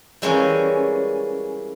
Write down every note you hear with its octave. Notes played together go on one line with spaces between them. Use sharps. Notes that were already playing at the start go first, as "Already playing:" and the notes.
E3 G3 G#3 A#3 C#4